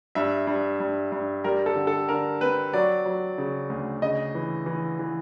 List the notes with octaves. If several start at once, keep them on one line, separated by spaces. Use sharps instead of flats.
G2 E5
G2
G2
G2
G3 A#4
A4
D3
A4
D3 A#4
C4 B4
F#3 D5
F#3
C#3
D2
C#3 D#5
E3
E3
E3